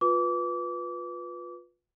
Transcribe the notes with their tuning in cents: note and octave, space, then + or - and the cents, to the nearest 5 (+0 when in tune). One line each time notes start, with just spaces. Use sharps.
F4 +20 B4 -5 D6 -25